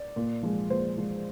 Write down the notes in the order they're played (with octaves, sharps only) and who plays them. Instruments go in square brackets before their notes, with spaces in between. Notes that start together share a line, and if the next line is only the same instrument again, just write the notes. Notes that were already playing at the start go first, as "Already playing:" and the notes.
Already playing: [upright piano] D5
A#2
F3 G#3
A#2 C5
F3 G#3